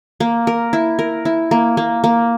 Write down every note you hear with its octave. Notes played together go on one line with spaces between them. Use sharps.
A#3
A#4
E4
A#4
E4
A#3
A#3
A#3